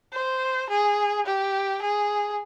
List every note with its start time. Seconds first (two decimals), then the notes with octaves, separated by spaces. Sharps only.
0.13 C5
0.69 G#4
1.26 G4
1.82 G#4